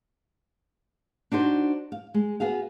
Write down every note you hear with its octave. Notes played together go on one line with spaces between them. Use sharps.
D4 D#4 F#4 C5
F5
G#3
B3 F#4 G#4 F5